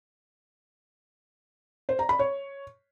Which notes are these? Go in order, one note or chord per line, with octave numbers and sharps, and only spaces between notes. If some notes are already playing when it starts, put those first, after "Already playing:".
C5
A#5
B5
C#5